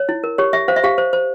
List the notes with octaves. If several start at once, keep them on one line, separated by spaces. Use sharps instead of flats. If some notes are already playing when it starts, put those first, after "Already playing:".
Already playing: C#5
E4
A#4
G4 C#5
G4 E5
C5 F5
E5
G4 F5
C5
C5